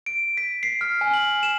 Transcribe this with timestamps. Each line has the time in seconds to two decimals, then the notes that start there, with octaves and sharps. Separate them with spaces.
0.06 D7
0.37 B6
0.63 C7
0.81 F6
1.01 G#5
1.14 F#7
1.43 E7